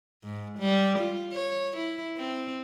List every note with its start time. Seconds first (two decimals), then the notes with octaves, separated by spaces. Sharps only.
0.23 G#2
0.58 G3
0.98 F4
1.33 C#5
1.76 E4
2.17 C4